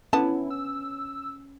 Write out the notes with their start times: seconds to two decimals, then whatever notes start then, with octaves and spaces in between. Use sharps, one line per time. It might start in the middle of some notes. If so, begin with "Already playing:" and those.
0.13 D3 B3 C#4 E4 A5
0.50 E6